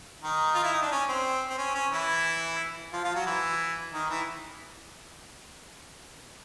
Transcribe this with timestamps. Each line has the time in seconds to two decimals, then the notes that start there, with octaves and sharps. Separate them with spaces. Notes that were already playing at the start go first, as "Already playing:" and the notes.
0.24 D#3 D#4
0.54 F4
0.63 E4
0.73 D#4
0.82 D4
0.91 C#4
1.08 C4
1.50 C4
1.58 C#4
1.75 C#4
1.92 E3 E4
2.93 F3 F4
3.04 F3 F4
3.15 F#3 F#4
3.26 E3 E4
3.93 D#3 D#4
4.10 E3 E4